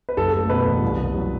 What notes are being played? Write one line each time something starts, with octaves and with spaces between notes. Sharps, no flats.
B4
F#1 A4
A3 A4
B2 B4
E2
C2
C2
F#3